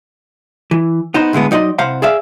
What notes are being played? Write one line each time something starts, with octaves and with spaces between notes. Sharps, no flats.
E3
B3 D#4 C5
A2 D3 G#3 B3
F#3 D#4 D5 D#5 C6
C2 C5 F5 F#5
G#4 D5 E5 F5